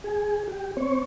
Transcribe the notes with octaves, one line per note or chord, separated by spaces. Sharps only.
G#4
G4
C4 C#5